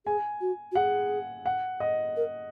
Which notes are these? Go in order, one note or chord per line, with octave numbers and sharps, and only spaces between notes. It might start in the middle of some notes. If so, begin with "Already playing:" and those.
G#4 G#5
F#4
F#4
G#4 F#5
F#5
D#5
A#4